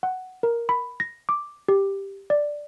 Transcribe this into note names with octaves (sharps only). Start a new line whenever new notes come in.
F#5
A#4
B5
A#6
D6
G4
D5